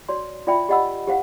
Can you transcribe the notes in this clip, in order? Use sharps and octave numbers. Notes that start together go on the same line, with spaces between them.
F#4 C#5 D5 C6
F4 D5 E5 G5 B5
G4 D5 D#5 F#5 B5 E6
G4 C5 F5 F#5